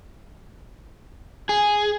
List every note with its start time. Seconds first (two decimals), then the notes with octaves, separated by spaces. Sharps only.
1.49 G#4